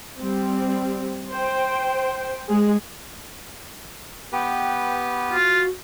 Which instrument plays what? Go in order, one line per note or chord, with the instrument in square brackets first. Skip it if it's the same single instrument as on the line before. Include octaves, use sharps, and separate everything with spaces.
[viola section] G3 C4
C5 G5
G#3 G#4
[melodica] B3 G4 B4 [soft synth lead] G5
[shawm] F4 [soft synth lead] F#4